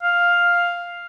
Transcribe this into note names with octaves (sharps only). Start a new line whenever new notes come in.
F5